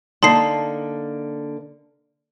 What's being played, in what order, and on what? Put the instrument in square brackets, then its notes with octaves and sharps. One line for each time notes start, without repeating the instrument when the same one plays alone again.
[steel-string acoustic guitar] D3 A#3 [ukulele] D#4 A5 [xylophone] C6 C7